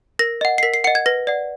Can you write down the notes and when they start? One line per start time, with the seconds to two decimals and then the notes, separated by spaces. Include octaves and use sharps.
0.19 A#4 A#6
0.41 D#5 F#5
0.58 C7
0.63 A#4 B6
0.74 C7
0.84 F#5 C#7
0.87 D#5
0.95 G#6
1.06 B4 A#6
1.27 D5 F#5